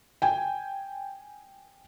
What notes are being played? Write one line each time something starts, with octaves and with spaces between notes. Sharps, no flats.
G5 G#5